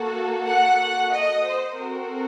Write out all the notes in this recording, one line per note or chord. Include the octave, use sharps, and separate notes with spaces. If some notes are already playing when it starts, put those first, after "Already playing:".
Already playing: A#3 F#4 A4 F#5
F#5
D#5
C5
C4 F#4 A4 A#4